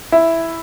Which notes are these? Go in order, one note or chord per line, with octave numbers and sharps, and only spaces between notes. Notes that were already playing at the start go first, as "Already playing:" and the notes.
E4